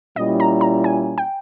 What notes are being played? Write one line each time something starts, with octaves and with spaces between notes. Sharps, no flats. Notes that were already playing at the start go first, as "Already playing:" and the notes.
A#2 G3 C#4 E4 D#5
A#5
A#5
G#5
G5